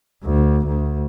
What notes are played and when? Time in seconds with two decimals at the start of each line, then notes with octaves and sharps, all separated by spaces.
0.24 D2
0.66 D2